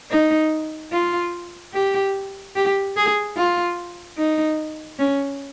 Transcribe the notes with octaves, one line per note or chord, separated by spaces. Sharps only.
D#4
F4
G4
G4
G#4
F4
D#4
C#4